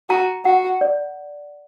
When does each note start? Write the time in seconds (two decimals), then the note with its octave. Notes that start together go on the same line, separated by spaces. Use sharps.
0.09 F#4 A#5
0.45 F#4 F#5
0.81 D5